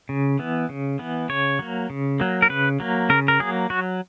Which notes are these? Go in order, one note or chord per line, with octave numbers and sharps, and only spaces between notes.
C#3
E3 B3
C#3
E3 B3
C#3 C#5
F#3 A#3
C#3
F#3 A#3
A#4
C#3 B4
F#3 A#3
C#3 A#4
A#4
F#3 A#3 G#4
F#3 F#4